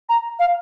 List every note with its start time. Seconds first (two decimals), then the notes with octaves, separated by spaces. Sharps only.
0.09 A#5
0.39 F5